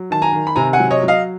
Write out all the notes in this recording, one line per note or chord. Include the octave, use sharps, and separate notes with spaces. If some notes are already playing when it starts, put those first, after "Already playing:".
Already playing: F#3
D#3 A5
G#5 A#5
D#3
B5
C3 G#5 A#5
F#5 G#5
F#3
C#5 D#5
F#3
D#5 F5